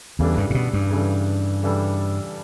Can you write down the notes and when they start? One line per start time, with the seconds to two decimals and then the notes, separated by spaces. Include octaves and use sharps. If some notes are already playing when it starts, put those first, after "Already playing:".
0.19 E2 C#3 E3 G3 D4 A4
0.37 G2
0.50 A2
0.55 B2
0.73 G2
0.91 C#3 E3 G3 D4 A4
1.62 C#3 E3 G3 D4 A4